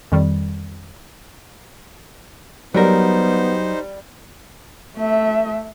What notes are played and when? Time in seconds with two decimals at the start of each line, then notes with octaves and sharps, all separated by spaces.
0.12 F2 D#3 G3
2.74 F#3 G3 B3 D#4 A#4 C5
4.97 A3 E5